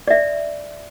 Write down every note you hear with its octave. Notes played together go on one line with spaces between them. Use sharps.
D5 E5